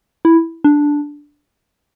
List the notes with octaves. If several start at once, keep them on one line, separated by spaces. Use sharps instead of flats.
E4
D4